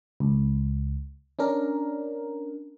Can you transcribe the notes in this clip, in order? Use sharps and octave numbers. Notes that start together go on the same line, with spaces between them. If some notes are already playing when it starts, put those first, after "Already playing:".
C#2
C#4 D4 A#4